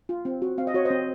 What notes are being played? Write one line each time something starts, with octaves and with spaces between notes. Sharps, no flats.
F4
C4
F#4
C4 F5
D#5
F#4 C#5
C5 D#5
C4